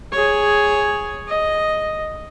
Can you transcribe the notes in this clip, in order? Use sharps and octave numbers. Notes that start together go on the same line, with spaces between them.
G#4 C#5
D#5